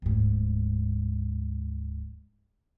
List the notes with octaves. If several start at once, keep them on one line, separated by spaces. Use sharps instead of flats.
D1 G#2